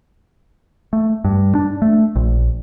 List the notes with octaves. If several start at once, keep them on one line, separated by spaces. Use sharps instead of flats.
A3
G2
D4
A3
A#1